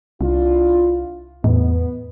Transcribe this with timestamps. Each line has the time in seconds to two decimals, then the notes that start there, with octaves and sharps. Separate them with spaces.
0.21 C2 D4 E4 F4
1.44 E2 A2 B3